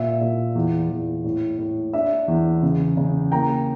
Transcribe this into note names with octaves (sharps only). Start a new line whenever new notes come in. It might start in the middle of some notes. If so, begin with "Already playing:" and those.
Already playing: A#2 E5
A#2
E2
E2
A2
A2
D4 E5
E2
C#3
C#3
A#3 G5 A#5